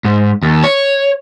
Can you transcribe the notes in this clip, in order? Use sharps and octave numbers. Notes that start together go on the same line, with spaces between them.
G#2
D#2
C#5